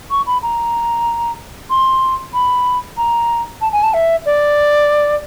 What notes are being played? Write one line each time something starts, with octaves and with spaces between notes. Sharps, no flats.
C#6
B5
A#5
C6
B5
A#5
A5
G#5
A5
E5
D5